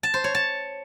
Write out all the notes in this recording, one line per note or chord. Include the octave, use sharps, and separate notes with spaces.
A5
C5
C#5
A5